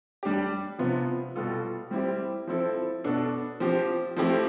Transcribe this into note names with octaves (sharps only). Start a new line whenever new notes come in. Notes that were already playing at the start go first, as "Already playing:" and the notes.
G3 D4 G4
C3 F3 B3 F4
B2 G3 B3 F4 A4
G3 C4 E4 G4
F3 C4 E4 A4
B2 B3 D4 A4
F3 C4 G4
F3 A3 C4 E4 G4